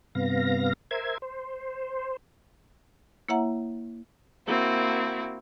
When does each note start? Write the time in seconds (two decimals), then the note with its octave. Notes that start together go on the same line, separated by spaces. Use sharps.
0.15 G2 C3 B3 F5 A#6
0.91 A#4 C5 E5 G#6
1.22 C5
3.29 A#3 E4 C#5 E5 F#5 A#5
4.47 A#3 C4 E4 F#4